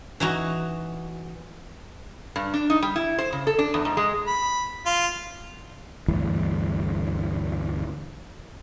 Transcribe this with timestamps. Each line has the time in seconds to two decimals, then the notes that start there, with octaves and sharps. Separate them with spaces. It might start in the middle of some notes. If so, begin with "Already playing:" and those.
0.20 E3 D#4 F#4 A#5
2.36 G2
2.54 D4
2.70 D#4
2.82 G3
2.96 E4
3.19 C5
3.33 C#3
3.47 A4
3.59 D4
3.74 E2
3.85 G#2
3.97 G#3
4.27 B5
4.86 F4
6.08 D2 G2 E3